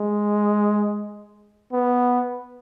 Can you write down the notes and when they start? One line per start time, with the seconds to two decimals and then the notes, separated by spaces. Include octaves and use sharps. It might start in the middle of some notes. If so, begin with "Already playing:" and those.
Already playing: G#3
1.73 B3